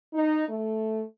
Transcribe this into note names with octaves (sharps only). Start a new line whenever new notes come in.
D#4
A3